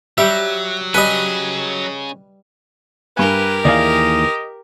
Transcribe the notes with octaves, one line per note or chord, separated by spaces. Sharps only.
F#3 G3 G4 E5
G3 C#4 G#4 B4 D#5 G#5
G2 G4 A#4 B4 G#5
D#2 E3 G#4 D5 D#5 F5